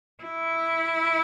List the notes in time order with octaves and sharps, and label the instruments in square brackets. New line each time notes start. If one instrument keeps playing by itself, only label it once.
[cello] E4